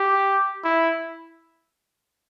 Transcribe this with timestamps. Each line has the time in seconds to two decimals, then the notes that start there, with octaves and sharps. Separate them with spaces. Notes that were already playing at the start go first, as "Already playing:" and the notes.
Already playing: G4
0.64 E4